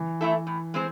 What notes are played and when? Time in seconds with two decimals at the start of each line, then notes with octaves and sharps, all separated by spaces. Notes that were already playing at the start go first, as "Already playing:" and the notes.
Already playing: E3
0.21 A3 E4 A4
0.47 A2
0.74 G#3 C4 G#4 C5